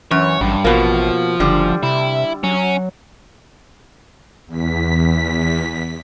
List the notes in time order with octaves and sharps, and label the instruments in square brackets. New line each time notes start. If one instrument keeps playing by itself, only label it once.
[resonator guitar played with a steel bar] F#2 [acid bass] E3 [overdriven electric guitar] C#5
[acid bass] A1 [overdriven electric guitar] G2
[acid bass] A1 [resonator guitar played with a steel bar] B2 A#3 [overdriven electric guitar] F3
[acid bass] F#1 [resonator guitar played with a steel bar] D3 G3
[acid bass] C3 [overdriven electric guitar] E4
[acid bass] F#3 [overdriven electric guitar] C#4
[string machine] E2 B6